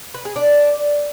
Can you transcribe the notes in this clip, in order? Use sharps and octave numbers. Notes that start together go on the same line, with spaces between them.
B4
G#4
D4